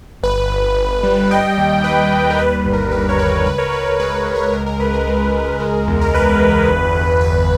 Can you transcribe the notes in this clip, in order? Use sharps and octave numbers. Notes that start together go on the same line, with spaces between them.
G1 B4
G1
G1
G3
G3 D#5 G5
D#2
D#2 B4 D#5
D#2
A#4
G3 B4
B4
G1
A#4
G2 B4
A#4 C#5
G2 B4
A#4
C#2 B4
A#4 C#5
C#2 B4
A#4 C#5
G#3 B4
B4
G#3
A#4 C#5
C#2 A#4
A#4
C#2 B4
A#4
G#3
C#2
G#3
E2
A#4
E2 B4
E2
G1
G1
G1 B4